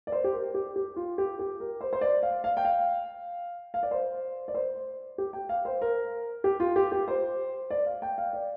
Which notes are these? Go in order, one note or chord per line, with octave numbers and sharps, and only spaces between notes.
D5
C5
G4
A#4
G4
G4
F4
G4
G4
A#4
C5
C5
D5
F5
F5
G5
F5
F5
D5
C5
D5
C5
G4
G5
F5
C5
A#4
G4
F4
G4
G4
C5
D5
F5
G5
F5
D5